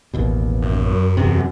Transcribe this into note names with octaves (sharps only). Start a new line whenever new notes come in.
A1 D#2 B2
F#2
E2 C3